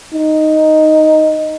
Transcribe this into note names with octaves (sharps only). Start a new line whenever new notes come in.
D#4